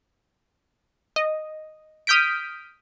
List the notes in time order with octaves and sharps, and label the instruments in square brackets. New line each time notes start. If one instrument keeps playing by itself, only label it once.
[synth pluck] D#5
D#6 F6 G6 B6 D7